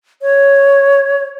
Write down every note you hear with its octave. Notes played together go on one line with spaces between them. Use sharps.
C#5